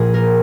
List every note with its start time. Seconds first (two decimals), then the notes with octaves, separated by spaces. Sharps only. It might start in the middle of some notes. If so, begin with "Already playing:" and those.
Already playing: A#2 F3 A#3 G#4
0.14 A#4